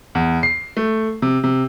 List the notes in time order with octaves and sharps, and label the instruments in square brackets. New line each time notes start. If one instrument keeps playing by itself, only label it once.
[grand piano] E2
C7
A3
C3
C3